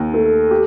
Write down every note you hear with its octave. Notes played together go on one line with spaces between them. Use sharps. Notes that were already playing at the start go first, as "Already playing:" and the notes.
Already playing: D#2
A3
G4